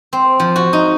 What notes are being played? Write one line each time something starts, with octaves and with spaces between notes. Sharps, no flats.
C4
F3
F#4
D#4